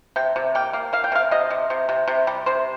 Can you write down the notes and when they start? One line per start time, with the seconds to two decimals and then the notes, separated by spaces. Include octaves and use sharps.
0.16 C3 G5
0.36 C3
0.55 A#3 G5
0.73 A#3
0.93 A#3 F5
1.04 G5
1.12 C3 F5
1.31 C3 D#5
1.50 C3
1.70 C3
1.89 C3
2.08 C3
2.27 G3
2.46 C3 C5